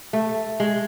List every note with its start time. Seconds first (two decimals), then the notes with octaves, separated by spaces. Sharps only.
0.13 A3
0.60 G#3